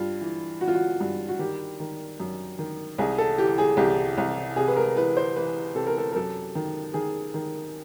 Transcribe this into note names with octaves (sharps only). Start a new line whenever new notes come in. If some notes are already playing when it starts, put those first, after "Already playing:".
Already playing: G2 F4
E3
E3 F#4
F4
F#4
G2
F#4
D#3 G4
D#3
F#2
D#3
C2 G#4
A4
E3 G4
G#4
C2 G4
C2
C3 G#4
B4
A#4
E3 B4
C5
E3 B4
C3 A4
A#4
A4
A#4
F#2 A4
D#3
D#3 G#4
D#3